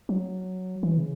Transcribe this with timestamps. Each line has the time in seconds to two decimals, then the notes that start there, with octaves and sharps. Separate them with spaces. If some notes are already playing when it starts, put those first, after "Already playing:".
0.09 F#3
0.83 E3
0.98 C#3